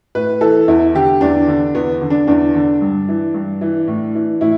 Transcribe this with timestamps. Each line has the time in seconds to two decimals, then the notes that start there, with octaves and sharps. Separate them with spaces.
0.15 A2 B4
0.41 E3 A4
0.68 E2 E4
0.95 D3 G4
1.21 E2 D4
1.48 D3
1.75 E2 B3
2.01 D3
2.10 D4
2.27 E2 D4
2.55 D3
2.81 G2
3.09 E3
3.34 G2
3.61 E3
3.88 A2
4.15 E3
4.41 A2 E4